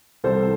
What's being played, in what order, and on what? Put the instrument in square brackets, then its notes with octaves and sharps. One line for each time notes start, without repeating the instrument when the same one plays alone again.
[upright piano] C2 C3 E3 G3 A4 C5